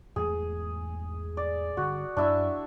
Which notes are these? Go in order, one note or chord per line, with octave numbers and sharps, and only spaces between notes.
E2 G#2 A3 G#4
D5
G2 D3 F#4
F#2 D4 E4 E5